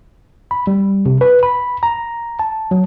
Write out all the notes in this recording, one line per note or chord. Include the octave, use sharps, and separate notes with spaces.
B5
G3
C3
B4
B5
A#5
A5
F#3